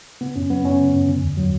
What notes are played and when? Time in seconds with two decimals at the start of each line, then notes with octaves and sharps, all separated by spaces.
0.21 C#3 B3
0.36 F#2 C#4
0.50 F#3 B3
0.65 F#2 C#4
0.80 C#3
0.94 F#2
1.08 D3
1.23 E2
1.37 F#3